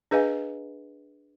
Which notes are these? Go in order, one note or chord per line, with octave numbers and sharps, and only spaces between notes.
D4 G#4 B4 D#5 F5 G#5